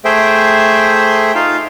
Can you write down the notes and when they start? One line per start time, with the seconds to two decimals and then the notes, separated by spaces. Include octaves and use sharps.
0.05 A3 G#4 C5 E5 G5
1.35 D#4 F4 F5